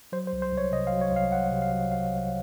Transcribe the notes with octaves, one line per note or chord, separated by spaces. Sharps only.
F#3 C5
C5
C2
C5
C2
C#5
C3 D#5
F5
F#3
C#5
C2 F5
C2 F#5
C3
F5
F#3
C2 F5
C2